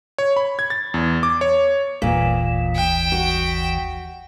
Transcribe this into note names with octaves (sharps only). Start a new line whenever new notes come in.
C#5
B5
G#6
A6
E2
D6
C#5
G1 D#2 A#2 E3
G5
F#4